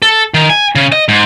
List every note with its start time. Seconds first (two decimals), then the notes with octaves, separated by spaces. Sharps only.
0.02 A4
0.34 D#3
0.50 G#5
0.75 C#3
0.92 D#5
1.08 G#2